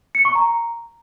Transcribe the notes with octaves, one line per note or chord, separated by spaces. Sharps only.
C#7
C#6
A#5